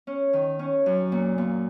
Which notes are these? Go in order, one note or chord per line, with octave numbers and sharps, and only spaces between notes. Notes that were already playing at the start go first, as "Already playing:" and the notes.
C#4
D#3
C#4
F#2
A#2
A#2